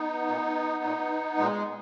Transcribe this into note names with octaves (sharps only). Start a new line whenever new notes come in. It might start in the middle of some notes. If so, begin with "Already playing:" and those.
Already playing: B3 D#4
A#2
A#2
A#2 G#3